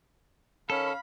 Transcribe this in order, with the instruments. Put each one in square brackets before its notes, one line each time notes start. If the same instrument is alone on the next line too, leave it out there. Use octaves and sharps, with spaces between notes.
[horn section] D#3 C#4 [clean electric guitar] A4 [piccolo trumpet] F5 [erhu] B5